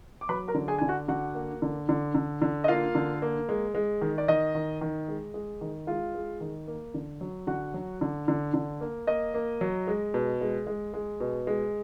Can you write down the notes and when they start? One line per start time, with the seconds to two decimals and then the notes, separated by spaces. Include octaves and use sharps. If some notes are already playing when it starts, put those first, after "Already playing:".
0.21 D6
0.29 F#3 B4 B5
0.48 A#4 A#5
0.54 D3
0.68 G#4 G#5
0.79 D3 G#5
0.88 F#4 F#5
1.08 D3 F#4 F#5
1.35 A#3
1.62 D3
1.89 D3
2.15 D3
2.42 D3
2.64 D#5
2.68 A#3 F4 F5
2.95 D3
3.22 A#3
3.49 G#3
3.75 G#3
4.02 D#3
4.18 D5
4.28 D#3 D#5
4.55 D#3
4.81 D#3
5.08 G#3
5.34 G#3
5.61 D#3
5.87 G#3 F4 F5
6.14 G#3
6.41 D#3
6.67 A#3
6.94 D3
7.21 F#3
7.47 D3 F#4 F#5
7.74 F#3
8.01 D3
8.28 D3
8.54 D3
8.81 A#3
9.07 A#3 D#5
9.34 A#3
9.61 F#3
9.87 G#3
10.14 B2
10.41 G#3
10.67 G#3
10.94 G#3
11.20 B2
11.47 G#3